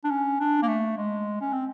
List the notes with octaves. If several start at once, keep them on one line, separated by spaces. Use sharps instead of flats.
D4
C#4
D4
A#3
A3
G#3
C#4
C4